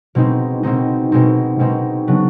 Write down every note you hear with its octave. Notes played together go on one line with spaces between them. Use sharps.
B2 G#3 C4 D#4
B2 G#3 C4 D#4
B2 G#3 C4 D#4
B2 G#3 C4 D#4
C#3 F#3 B3 D4